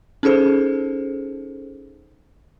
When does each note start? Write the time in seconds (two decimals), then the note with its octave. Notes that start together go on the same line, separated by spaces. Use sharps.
0.23 C#4 D#4 G#4 A4 C5